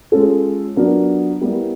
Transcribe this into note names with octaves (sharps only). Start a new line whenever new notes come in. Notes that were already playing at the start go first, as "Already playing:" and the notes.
G#3 C#4 F4 A4
F#3 B3 D4 F4 A#4
G3 B3 E4 G4 A#4